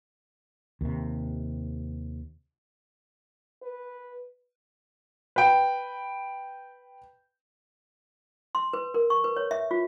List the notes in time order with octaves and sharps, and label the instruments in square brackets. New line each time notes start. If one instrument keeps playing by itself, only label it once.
[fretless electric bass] D#2 C3
[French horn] B4
[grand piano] B4 G5
[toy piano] C6
B4
A#4
C#6
B4
C#5
E5
F4